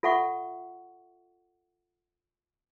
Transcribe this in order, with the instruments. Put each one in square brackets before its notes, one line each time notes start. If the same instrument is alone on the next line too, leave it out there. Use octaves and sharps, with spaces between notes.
[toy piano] F4 A4 E5 F#5 C#6